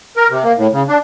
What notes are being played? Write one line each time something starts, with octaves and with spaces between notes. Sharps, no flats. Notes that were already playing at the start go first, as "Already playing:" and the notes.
A#4
C3
A#3
A2
C#3
D4